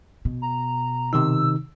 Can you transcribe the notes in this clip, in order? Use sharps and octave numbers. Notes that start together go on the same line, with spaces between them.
B2
A#5
C3 D#3 D#4 E6